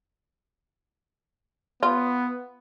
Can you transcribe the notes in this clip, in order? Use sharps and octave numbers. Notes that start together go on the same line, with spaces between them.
B3 F4